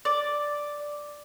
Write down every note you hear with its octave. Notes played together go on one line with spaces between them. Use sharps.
D5